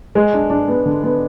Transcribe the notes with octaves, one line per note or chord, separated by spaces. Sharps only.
G#3
D4
D4
B3
D3
B3